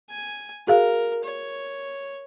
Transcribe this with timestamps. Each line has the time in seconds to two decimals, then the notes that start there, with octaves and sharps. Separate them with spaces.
0.10 G#5
0.67 F#4 G#4 A#4 F5
1.24 C#5